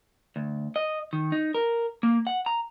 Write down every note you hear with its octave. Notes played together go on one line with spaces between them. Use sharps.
D2
D#5
D#3
D#4
A#4
A#3
F#5
A#5